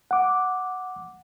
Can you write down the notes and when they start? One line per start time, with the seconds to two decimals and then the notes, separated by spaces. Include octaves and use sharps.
0.11 F#5 D6